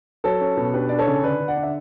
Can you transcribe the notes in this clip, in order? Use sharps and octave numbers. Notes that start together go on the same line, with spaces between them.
F#3 A4 C#5
C#4
B2
D4 G4 B4
D4 D5
A4 C#5
C#3
D3 B4 D5
D3
D5 F#5
D4
E5